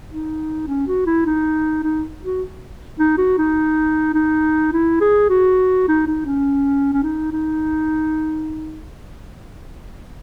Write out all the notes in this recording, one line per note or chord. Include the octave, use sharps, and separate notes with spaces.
D#4
C#4
F#4
E4
D#4
D#4
F#4
D#4
F#4
D#4
D#4
E4
G#4
F#4
D#4
D#4
C#4
C#4
D#4
D#4